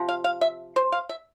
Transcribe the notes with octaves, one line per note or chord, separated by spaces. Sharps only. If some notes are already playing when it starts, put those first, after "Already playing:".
Already playing: C3 F3
F5
F5
E5
C5
F5
E5